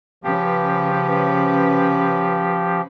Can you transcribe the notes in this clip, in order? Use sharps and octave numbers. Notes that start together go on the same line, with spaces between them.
C#3 F3 C#4 G4 B4